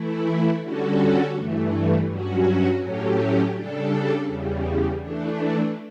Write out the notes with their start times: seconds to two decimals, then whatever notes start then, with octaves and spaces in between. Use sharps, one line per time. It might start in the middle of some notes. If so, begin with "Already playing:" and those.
Already playing: E3 A3 E4
0.61 D3 G3 C#4 F#4 A4
1.34 G2 E3 A3
2.08 G2 F#3 C#4 F#4
2.81 A2 F#3 A3 C#4 G4
3.54 C#3 G3 D4 A4
4.26 E2 C#3 G3
5.00 E3 A3 D4